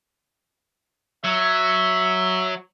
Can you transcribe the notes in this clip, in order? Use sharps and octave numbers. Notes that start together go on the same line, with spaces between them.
F#3 E5